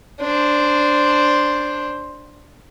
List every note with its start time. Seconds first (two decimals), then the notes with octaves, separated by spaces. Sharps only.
0.21 D4 C5